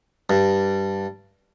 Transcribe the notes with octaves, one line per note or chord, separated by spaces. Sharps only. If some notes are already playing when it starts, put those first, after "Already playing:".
G2